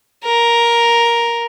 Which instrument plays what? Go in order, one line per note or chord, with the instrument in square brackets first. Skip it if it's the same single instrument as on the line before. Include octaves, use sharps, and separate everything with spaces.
[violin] A#4